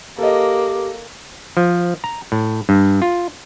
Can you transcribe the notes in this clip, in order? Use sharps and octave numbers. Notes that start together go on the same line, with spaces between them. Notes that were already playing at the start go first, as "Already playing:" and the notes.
A#3 G4 A4 D#5
F3
A#5
A2
G2
F4